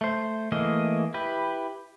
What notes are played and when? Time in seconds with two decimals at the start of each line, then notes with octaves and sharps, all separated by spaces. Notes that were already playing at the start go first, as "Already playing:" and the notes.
0.01 A3 C5
0.52 E3 A3 A#3 G#4 D#5
1.14 E4 G4 B4